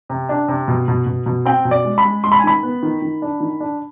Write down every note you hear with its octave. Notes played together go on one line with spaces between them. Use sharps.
C3
D4
C3
B2
B2
B2
B2
C4 G5
B2
D5
G#3
B5
G#3
G#3 C6
B5
G#5
D#3 B5
B3
D#3
D#3
D4
D#3
D4